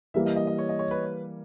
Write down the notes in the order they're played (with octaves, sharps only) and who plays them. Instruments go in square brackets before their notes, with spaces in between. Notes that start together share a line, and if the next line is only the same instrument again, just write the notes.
[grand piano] E3 G3 A#3 [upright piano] E5
[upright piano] D#5
D#5
D#5
C#5
D#5
C#5
B4